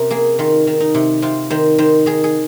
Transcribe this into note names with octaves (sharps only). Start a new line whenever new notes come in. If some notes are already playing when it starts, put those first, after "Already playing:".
Already playing: C3 C#4 A#4
A#3 G#4
D#3 F4
D#3
D#4
C3
C3 F4
D#3 C5
D#3 C5
D#3 G#4
G#4